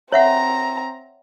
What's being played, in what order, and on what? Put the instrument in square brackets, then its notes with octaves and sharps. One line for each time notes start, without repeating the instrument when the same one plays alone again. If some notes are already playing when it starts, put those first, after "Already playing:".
[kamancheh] C4 A#5 [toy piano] C#5 E5 F#5